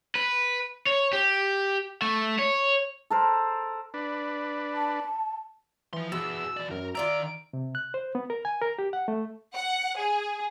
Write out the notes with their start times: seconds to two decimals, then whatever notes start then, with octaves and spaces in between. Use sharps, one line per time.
0.15 B4
0.87 C#5
1.13 G4
2.02 A3
2.39 C#5
3.10 A4 A#4 C5
3.94 D4 B4
4.75 A5
5.93 E3 F3 C6
6.12 B2 B3 G#4 E6
6.57 E3 D5
6.71 F#2 A#4
6.95 D#3 F4 D5 E5 A#5 D7
7.53 C3
7.75 F#6
7.94 C5
8.15 B3
8.30 A#4
8.45 G#5
8.62 A#4
8.79 G4
8.93 F#5
9.08 A3
9.56 F#5
10.00 G#4